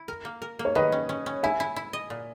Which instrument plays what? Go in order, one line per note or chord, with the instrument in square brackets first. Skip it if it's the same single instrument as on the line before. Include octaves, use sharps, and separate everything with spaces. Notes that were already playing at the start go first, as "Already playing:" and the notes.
Already playing: [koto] E4
A#4
A#3
A#4
A#3
[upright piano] C#5
[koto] D#3 [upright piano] B4 D#5
[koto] C#4
C#4
C#4
[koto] E4 [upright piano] E5 G#5
[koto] E4
E4
D#5
A#2